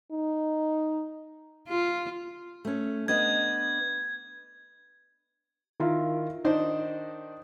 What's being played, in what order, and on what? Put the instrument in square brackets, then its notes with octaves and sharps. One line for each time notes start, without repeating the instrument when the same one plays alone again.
[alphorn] D#4
[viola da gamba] F4
[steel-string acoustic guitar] A3 C#4
[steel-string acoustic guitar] B3 D4 D#5 [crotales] G#6
[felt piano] D#3 E4 F4 [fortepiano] A#4
[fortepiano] D#3 D4 C5 [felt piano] D#5